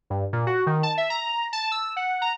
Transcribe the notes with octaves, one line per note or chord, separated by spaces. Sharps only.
G2
A#2
F#4
D#3
A5
E5
A#5
A5
E6
F#5
A#5